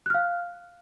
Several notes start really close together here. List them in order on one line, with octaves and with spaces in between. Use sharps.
F#6 F6 F5